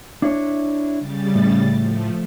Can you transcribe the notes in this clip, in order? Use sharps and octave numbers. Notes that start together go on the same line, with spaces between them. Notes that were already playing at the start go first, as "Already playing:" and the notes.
D4 E4 C#5
C#3 G3 A6
A2
F3 A3